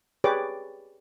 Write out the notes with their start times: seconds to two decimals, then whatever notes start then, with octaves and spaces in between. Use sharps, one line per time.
0.24 G4 G#4 B4 C#5 D5 D6